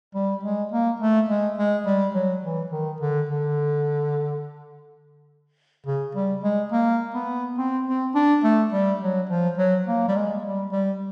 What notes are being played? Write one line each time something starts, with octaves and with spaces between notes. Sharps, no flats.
G3
G#3
A#3
A3
G#3
G#3
G3
F#3
E3
D#3
D3
D3
C#3
G3
G#3
A#3
B3
C4
C4
D4
A3
G3
F#3
F3
F#3
A#3
G3
G#3
G3
G3